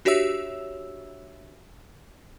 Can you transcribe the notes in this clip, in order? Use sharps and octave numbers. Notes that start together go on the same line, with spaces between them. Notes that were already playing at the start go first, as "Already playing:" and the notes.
D4 F#4 G4 C#5 E5 E6